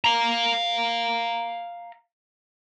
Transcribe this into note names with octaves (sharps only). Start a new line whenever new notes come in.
F5 A#5